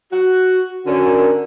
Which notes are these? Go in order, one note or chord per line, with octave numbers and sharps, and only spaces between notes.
F#4
D3 C#4 F#4 A#4